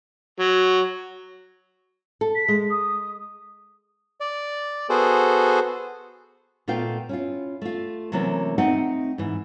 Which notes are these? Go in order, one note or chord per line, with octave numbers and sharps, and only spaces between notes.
F#3
A4
B6
G#3
D#6
D5
B3 F#4 G#4 A4 C5
A#2 A3 B3 F4 F5 G5
C#4 E4 F4
A3 F4
C3 E3 F#3 A3 A#3 C#4
A3 C4 D#4 D#5 F#5 G5
G#2 E3